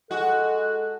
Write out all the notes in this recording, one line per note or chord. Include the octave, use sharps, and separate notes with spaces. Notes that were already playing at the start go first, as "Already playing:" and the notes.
G#3 F#4 A4 F#6